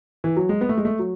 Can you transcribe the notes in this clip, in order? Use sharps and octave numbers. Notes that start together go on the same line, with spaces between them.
E3
F#3
G#3
B3
A3
G#3
A3
F#3